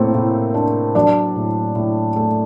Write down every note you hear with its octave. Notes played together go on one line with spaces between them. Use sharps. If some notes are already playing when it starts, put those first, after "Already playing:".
Already playing: A2 A3 A#3 C4 A#4 C5
A2
D4
F#3 D4 D5
A2
A2
A3